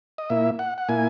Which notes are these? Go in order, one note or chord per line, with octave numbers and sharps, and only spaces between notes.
D#5
A#2 A#3 E4 E5
F#5
F#5
A#2 A#3 E4 G#5